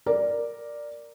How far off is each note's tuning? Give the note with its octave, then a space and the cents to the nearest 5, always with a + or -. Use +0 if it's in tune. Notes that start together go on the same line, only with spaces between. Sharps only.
A#4 +0 D5 +0